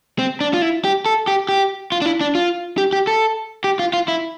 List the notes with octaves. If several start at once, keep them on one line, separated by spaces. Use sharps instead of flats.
C4
D4
F4
E4
G4
A4
G4
G4
F4
D4
E4
D4
F4
G4
G4
A4
G4
F4
F4
E4